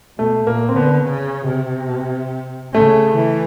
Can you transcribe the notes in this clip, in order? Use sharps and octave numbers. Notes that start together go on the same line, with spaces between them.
B2 A3
A#2 A#3
C4
D3 B3
C#3
C3
C#3 A3
E3